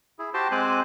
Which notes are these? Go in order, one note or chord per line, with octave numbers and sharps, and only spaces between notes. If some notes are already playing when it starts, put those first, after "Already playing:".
E4 G#4
F#4 G4 C5 G5 A5 C6
G#3 C4 C5 G#5 D6 F#6